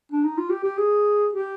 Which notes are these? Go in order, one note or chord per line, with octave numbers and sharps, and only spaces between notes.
D4
D#4
F4
G4
G4
G#4
G4